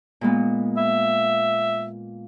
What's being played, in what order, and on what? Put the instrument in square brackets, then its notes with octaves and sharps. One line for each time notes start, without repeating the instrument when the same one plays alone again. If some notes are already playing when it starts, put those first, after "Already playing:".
[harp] A#2 G#3 B3
[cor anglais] E5